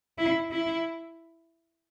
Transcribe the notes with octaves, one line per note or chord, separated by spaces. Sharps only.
E4
E4